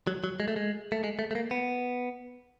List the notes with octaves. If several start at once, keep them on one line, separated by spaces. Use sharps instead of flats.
F#3
F#3
G#3
A3
G#3
A3
G#3
A3
A3
A#3
B3